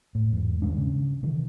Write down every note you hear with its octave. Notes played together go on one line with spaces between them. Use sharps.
A2
E2 G#2
D#2 G#2 G#3 D4
C#3
C3 D#3 E3